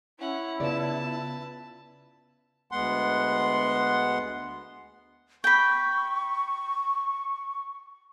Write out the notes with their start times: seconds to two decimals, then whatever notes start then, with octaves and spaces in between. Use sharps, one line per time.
0.20 C#4 E4 F#5
0.60 C#3 B3 F4 B4 D5 A5
2.72 D2 G#3 B3 F#5 C6
5.44 G5 B5 C#6